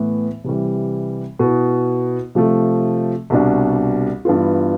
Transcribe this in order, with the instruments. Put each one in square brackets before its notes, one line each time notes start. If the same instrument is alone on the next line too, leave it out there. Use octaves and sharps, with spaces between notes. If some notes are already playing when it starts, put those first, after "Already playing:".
Already playing: [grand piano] A2 E3 B3
C3 E3 G3
B2 B3 E4
C3 F3 A3
C2 B2 G3 D4
G2 E3 B3 F4